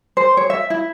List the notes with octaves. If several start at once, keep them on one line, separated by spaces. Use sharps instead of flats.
C5
C#5
E5
E4